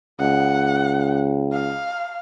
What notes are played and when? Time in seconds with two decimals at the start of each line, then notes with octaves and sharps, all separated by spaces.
0.20 C#2 F#5
1.52 F5